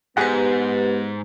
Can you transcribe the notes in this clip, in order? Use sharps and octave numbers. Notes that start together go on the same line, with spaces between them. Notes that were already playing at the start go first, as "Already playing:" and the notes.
G#2 B3 G4 G#4 B4 F#5